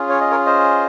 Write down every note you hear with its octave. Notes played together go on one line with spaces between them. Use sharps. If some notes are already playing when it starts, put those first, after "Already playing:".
Already playing: C#4 F4 G#4
C#5
D#5
A#4 C#5
C5 D#5